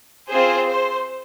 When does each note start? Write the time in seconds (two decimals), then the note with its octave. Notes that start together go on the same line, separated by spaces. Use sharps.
0.30 C4 F4 G#4 C5
0.69 C5